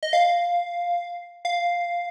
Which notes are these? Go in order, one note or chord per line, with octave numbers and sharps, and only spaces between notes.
D#5
F5
F5